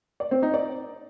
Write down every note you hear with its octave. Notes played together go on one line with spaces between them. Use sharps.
D5
C4
D#4
D5